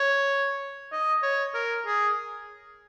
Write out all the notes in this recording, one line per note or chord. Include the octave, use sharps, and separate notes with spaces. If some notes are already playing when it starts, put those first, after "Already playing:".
Already playing: C#5
D#5
C#5
A#4
G#4